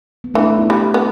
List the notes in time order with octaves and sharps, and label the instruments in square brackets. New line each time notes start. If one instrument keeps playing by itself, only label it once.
[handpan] B3
[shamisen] E3 [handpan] A3 D4
[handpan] B3 E4
[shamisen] G3
B3